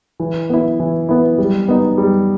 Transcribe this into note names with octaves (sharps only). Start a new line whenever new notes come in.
E3
B3 E4
E3
B3 E4
G3
B3 D#4
G3